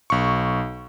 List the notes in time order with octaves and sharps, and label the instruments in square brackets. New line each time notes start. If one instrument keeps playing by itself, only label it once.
[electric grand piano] B1 C#6